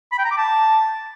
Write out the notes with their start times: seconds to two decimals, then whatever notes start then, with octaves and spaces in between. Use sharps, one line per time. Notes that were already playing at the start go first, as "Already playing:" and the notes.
0.12 B5
0.18 G5
0.24 A#5
0.31 D6
0.37 A5